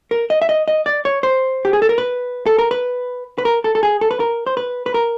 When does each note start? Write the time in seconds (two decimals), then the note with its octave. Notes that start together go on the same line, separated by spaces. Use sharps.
0.11 A#4
0.30 D#5
0.42 E5
0.49 D#5
0.68 D#5
0.86 D5
1.05 C#5
1.23 C5
1.65 G4
1.73 G#4
1.82 A4
1.89 A#4
1.98 B4
2.46 A4
2.59 A#4
2.71 B4
3.38 B4
3.45 A#4
3.64 A4
3.75 A4
3.83 G#4
4.01 A4
4.11 B4
4.20 A#4
4.47 C5
4.57 B4
4.86 B4
4.94 A#4